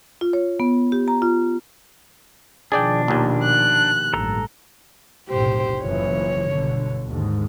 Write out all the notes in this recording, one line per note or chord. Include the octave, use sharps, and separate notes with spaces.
F4
C#5
B3
G4
A#5
F4
B2 D#3 F3 D4 G#4 D5 G5
A#1 D#2
F#6
A1 G2 A4 A#5 F#6
F1 B1 A2 G4 C5
F#1 E3 F3 C#5
G1 B2 D3
D#2 G#2 D3